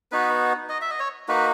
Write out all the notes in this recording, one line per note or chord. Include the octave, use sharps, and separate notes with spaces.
B3 D#4 F#4 B4
D#5
E5
D#5
C#5
A#3 D#4 F#4 B4